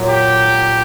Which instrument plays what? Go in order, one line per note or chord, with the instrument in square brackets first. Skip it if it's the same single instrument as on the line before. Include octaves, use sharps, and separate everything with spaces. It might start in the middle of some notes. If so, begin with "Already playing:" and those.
Already playing: [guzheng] A#2 F#3
[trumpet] G4